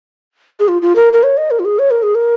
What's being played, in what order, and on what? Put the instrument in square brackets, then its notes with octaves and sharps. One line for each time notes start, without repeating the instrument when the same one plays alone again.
[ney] G#4
F4
F4
A#4
A#4
C#5
D#5
A#4
F4
G#4
C#5
A#4
G#4
A#4